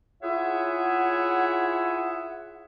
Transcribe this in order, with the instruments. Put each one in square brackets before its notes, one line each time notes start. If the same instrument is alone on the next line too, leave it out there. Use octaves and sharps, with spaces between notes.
[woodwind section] E4 F4 G#4 C#5 E5 F#5